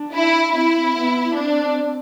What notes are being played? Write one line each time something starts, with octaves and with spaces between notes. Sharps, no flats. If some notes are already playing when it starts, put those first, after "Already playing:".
Already playing: D4
E4
C4 E4
B3
C4 D4